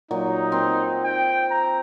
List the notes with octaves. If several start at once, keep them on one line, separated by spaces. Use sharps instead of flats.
A#2 F#3 D#4
C4
G5
A#5